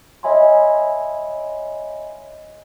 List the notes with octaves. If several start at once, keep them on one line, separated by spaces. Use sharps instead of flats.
C#5 D#5 E5 G#5 B5 C6